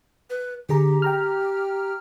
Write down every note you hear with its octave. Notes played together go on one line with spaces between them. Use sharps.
B4
D3 G4 G#4 A#5
G5 A#5 F6